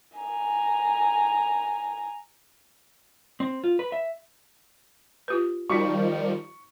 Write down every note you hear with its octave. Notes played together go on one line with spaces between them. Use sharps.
G#5 A#5
C4
F4
B4
E5
F4 G4 B4
D#3 F3 G3 D#4 F#4 C#6